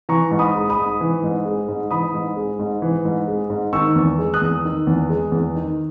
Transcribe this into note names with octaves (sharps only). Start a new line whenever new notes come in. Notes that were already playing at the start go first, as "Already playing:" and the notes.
E3 A#5 C#6
G#2
B5 D#6
G#3
B5 D#6
G#2
E3
G#2
G#3
G#2
E3 B5 D#6
G#2
G#3
G#2
E3
G#2
G#3
G#2
D#3 C#6 E6
E2
G#3
D#6 F#6
E2
D#3
E2
G#3
E2
D#3